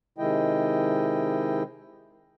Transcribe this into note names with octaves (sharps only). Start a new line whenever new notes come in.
C3 D#3 G#3 E4 D#5 G5